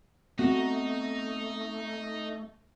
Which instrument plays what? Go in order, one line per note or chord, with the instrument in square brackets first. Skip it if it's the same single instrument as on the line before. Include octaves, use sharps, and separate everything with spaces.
[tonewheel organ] A3 [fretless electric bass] B3 C4 [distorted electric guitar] D#4 [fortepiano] F#4